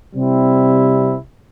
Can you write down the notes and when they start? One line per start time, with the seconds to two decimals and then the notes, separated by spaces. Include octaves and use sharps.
0.14 C3 G3 C4 E4